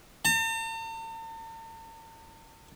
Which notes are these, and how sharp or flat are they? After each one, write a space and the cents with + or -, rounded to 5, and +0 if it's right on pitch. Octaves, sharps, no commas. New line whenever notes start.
A5 +45